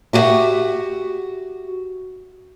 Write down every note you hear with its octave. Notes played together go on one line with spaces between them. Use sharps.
E4 F#4 G4 D5 E5 F#5